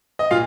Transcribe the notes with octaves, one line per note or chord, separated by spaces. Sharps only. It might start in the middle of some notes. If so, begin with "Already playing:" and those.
D#5
A#2 F4 F5